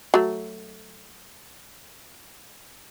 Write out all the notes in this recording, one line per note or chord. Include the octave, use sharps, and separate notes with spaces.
F#3 A3